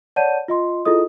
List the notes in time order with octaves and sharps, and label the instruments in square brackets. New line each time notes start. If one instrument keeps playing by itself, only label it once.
[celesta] C#5 D5 F#5 A5 G6 D#7
F4 D#5 C6
E4 F4 G#4 A4 D#5 D#6